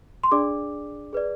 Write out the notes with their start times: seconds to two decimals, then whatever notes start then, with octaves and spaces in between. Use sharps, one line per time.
0.24 C6
0.31 D4 G#4 D5 D6
1.13 G#4 B4 D5